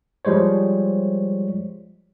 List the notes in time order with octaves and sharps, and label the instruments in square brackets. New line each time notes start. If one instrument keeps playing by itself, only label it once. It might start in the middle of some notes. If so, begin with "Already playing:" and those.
[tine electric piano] F3 G3 G#3 C5 C#5